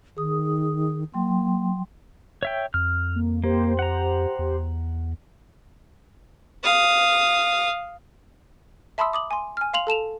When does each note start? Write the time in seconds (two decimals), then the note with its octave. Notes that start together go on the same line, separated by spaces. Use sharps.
0.17 D#3 G#4 D#6
1.14 F#3 A#3 G5 C6
2.43 C#5 E5 G5
2.74 F2 F6
3.16 A#3
3.44 A#3 G4 C5
3.79 F#5 A#5
4.39 E2
6.63 F5 D#6
8.98 E5 A5 B5 C6 D#6 E6
9.13 D6 D#6 F#7
9.31 G#5 C6
9.57 G#5 F6
9.74 F5 C6 F7 F#7
9.87 A4 A5 E7 F7